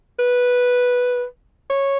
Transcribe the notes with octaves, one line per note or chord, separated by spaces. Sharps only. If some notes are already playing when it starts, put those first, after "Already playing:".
B4
C#5